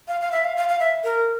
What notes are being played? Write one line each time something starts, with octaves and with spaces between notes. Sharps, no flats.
F5
F5
E5
F5
F5
F5
E5
A#4